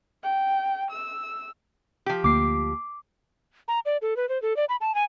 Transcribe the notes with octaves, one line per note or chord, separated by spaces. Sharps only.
G5
E6
F3 G4
D2 A#3 D6 C7
A#5
D5
A4
B4
C5
A4
D5
B5
A5
G#5